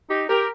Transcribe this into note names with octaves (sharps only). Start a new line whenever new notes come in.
D#4 G4
G4 A#4